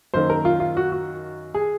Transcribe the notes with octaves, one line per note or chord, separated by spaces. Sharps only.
F#2 D#3 A#3 C5
A#4
F4
F4
F#4
F#4
G#4